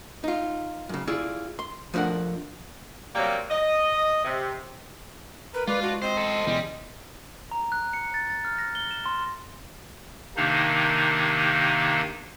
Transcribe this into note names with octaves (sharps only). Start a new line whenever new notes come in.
D#4 F4
F#2 C#3
E4 F4 G#4 D5
C6
F3 A3 D4 A#4 F#5
C3 F#3 G3 A#3
D#5
C3
A#4 B4
G#3 F4 B4 D5
D4 F#4
C4 C5 D#5
A4 C5
C#2 B2 E3 G3 G#3
A#5
F#6
C#7
A6
A6
F6
A#6
G7
E7
C6
C3 D#3 A#3 D4 D#4